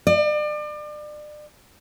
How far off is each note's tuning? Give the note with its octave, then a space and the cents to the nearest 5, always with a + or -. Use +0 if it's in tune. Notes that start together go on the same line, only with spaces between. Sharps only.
D5 +35